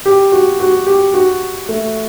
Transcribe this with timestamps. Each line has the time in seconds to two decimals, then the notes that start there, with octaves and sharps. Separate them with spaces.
0.06 G4
0.32 F#4
0.60 F#4
0.87 G4
1.14 F#4
1.69 A3